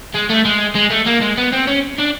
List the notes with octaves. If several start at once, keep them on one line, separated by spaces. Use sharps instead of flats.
G#3
A3
G#3
G#3
A3
A#3
G#3
B3
C4
C#4
D4